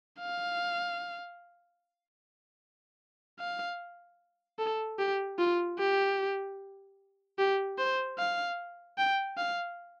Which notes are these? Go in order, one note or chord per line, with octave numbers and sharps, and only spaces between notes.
F5
F5
A4
G4
F4
G4
G4
C5
F5
G5
F5